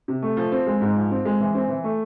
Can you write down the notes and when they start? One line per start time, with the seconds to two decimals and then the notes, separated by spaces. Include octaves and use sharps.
0.08 C3
0.23 A3
0.37 F3
0.52 C4
0.67 G#3
0.81 G#2
0.96 F3
1.11 C4
1.25 G#3
1.40 E3
1.55 C4
1.68 E3
1.84 A3